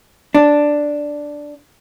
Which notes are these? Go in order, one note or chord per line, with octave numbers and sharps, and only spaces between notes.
D4